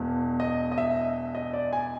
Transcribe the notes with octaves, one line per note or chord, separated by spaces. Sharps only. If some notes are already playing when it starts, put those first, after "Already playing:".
Already playing: E1 E2
D#5
D#5
E5
D#5
D5
G#5